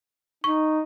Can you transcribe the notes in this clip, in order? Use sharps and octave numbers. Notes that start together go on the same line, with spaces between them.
D#4 C#6